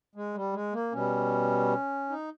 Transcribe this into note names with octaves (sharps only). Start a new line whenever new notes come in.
G#3
G3
G#3
A#3
B2 G3 C#4
D#4